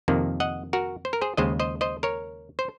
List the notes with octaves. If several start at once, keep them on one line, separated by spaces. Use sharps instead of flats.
F2 C3 D#3 A#3
D#5 F#5
F#4 A#4
C5
A#4
G#4 C5
D#2 C#3 G#3 C5 D#5
C5 D#5
C5 D#5
A#4 C#5
C5